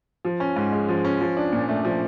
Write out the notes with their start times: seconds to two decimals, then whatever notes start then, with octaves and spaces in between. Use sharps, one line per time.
0.25 F3
0.40 C#4
0.56 G#2
0.72 G#3
0.89 F3
1.05 C#4
1.21 F3
1.37 D4
1.52 A#2
1.69 A3
1.85 F3